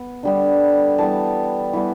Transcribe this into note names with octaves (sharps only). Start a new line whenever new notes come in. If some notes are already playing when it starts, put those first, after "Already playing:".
Already playing: B3
D3 G3 B3
E3 G3 B3 A5
E3 G3 B3